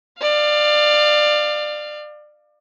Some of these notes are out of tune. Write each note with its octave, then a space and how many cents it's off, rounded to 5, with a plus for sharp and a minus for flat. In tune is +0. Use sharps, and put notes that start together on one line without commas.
D5 +25 F5 +0